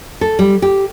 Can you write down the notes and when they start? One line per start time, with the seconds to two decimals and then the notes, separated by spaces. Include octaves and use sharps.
0.21 A4
0.39 G3
0.62 G4